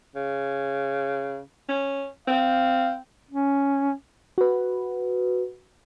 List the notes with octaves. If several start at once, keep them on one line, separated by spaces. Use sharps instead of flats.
C#3
C#4
C4 F5
C#4
F#4 B4